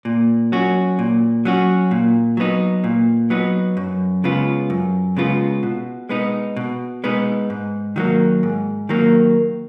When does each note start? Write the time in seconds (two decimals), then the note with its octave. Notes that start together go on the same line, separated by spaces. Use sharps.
0.05 A#2
0.52 F#3 C#4 F#4
0.99 A#2
1.45 F#3 C#4 F#4
1.91 A#2
2.37 F#3 B3 D#4
2.84 A#2
3.30 F#3 B3 D#4
3.77 F#2
4.24 C#3 G#3 B3 F4
4.70 F#2
5.17 C#3 G#3 B3 F4
5.63 B2
6.09 G#3 B3 D#4
6.57 B2
7.04 G#3 B3 D#4
7.50 G#2
7.96 D#3 F#3 A#3
8.43 G#2
8.89 D#3 F#3 A#3